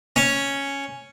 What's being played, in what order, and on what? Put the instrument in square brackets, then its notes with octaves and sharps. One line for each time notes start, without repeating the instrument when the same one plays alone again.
[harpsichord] C#4